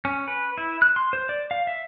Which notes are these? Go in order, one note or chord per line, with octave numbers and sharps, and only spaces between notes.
C#4
B4
E4
F#6
C6
C5
D5
F5
E5